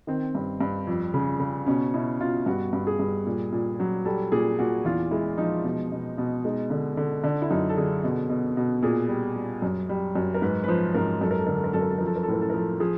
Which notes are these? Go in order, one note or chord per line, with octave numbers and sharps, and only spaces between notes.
D#3 C4
G2
G2
F2
C#3
C#3
B2 C#4
B2 E4
B2 F4
G2 F#4
G2
G#4
G2
A#2
A#2
F#3
G3 A4
A#2 G#4
A#2 F#4
E2 F4
G#3 E4
F3 D#4
B2
B2
B2
G#3 D#4
D3
D3
D3 D4
E4
F#2 D#4
A4
D3 G#4
B2
B2
B2
A#2 G#4
G3
G3
F#2
G3
F#2
A#4
G#2 B4
B4
F3 C5
G#2 A#4
F#2 A4
A#4
A4
D3 A#4
A4
A#4
F#2 A4
A#4
A4
F3 A#4
A4
A#4
A4
A2 A#4
A4
A#4
F3 A4
F3 G#4